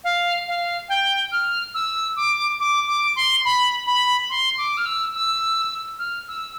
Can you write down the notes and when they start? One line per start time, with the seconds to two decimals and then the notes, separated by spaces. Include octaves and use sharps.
0.04 F5
0.47 F5
0.89 G5
1.32 F6
1.74 E6
2.16 D6
2.60 D6
2.87 D6
3.16 C6
3.45 B5
3.86 B5
4.30 C6
4.58 D6
4.77 F6
4.86 E6
5.14 E6
5.98 F6
6.28 E6